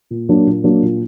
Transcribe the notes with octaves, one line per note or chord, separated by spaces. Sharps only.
A#2
F#3 A#3 D4
A#2
F#3 A#3 D4
A#2